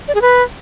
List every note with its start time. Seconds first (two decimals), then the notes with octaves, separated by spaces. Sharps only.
0.08 D5
0.15 G#4
0.22 B4